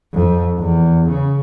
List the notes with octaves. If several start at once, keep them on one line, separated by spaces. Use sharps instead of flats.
F2
E2
C#3